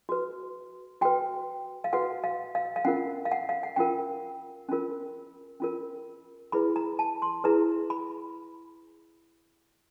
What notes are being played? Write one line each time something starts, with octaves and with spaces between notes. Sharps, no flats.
F#4 B4
F#4 B4 G5
F5
F#4 B4 F#5
F5
F5
F5
C#4 F4 A#4 F#5
F5
F#5
F5
F#5
C#4 F4 A#4 G5
C#4 F4 A#4
C#4 F4 A#4
E4 G#4 B4 B5
A#5
A5
C6
E4 G#4 B4 A#5
B5